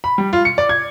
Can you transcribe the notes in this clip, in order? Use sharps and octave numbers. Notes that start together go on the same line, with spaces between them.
B5
G3
F4
C#7
D5
G#6